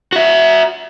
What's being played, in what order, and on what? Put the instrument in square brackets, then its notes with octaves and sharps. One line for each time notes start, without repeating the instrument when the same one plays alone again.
[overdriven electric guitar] F#4 E5